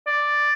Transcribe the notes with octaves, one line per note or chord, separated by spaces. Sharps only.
D5